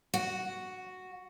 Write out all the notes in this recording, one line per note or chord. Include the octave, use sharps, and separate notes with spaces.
F#4